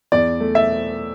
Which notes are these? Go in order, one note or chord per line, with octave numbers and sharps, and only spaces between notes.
E2 D5
A3
E5